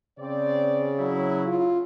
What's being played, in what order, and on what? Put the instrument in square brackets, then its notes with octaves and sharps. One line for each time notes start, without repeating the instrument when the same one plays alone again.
[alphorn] C#3 [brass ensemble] C4 D5
[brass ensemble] F#3 E4
[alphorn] F4